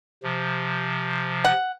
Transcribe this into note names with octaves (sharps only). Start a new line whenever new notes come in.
C3 F3
F#5